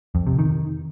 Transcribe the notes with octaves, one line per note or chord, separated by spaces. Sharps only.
F2
C3
D#3